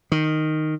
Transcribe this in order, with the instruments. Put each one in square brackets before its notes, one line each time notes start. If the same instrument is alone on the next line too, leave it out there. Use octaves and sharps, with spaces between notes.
[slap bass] D#3